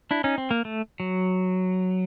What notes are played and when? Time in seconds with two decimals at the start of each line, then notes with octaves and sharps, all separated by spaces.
0.11 D4 E4
0.24 C#4 D#4
0.38 C4
0.51 A#3
0.65 A3
1.00 F#3